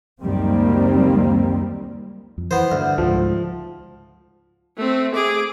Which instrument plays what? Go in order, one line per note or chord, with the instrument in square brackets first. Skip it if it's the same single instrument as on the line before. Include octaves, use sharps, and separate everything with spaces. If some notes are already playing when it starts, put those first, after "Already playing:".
[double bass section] C#2 F#2 D#3 G3 A#3 C4
[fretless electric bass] F2
[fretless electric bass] E3 [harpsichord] B3 C5
[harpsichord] D2 [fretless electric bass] G2
[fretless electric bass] C#2 G#2 [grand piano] F3
[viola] A3 C4
G#4 D6